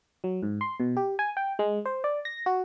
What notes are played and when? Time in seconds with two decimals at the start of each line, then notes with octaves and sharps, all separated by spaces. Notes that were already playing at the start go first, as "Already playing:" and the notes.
0.24 F#3
0.43 G#2
0.61 C6
0.80 B2
0.97 G4
1.19 G#5
1.37 G5
1.59 G#3
1.85 C5
2.04 D5
2.25 A#6
2.46 F#4